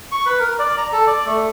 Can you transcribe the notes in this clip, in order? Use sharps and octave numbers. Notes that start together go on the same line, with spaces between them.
C#6
B4
A#4
D5
A#5
A4
D5
A3